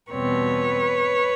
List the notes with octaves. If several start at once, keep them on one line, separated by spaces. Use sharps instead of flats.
E2 B2 G3 C4 B4 C#5